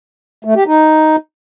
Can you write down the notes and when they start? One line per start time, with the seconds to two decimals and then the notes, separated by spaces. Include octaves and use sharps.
0.45 A3
0.56 G4
0.67 D#4